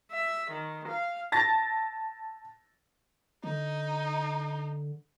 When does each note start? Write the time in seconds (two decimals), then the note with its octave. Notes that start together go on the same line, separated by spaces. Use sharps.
0.12 E5
0.51 D#3
0.88 F5
1.32 A5 A6 A#6
3.44 D3 D#4